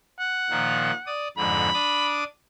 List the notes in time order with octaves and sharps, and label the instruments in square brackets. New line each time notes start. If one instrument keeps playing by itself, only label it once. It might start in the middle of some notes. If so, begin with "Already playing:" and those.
[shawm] F#5
[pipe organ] A#2 D#3 F3
D5 D#6
[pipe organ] F2 G#2 D3 [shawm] B5
[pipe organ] D4 D6 D#6